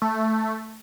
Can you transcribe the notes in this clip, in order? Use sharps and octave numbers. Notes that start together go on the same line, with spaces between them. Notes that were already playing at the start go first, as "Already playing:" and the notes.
A3